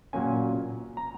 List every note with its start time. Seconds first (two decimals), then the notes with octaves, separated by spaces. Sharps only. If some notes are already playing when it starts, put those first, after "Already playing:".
0.13 A#2 F#3 A#3 C#4 G#5
0.97 A#5